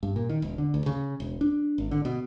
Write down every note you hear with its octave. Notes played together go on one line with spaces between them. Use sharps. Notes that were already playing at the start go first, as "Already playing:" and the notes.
G2
A#2
D#3
E1
D3
D2
C#3
E1
D4
G#1
D3
B2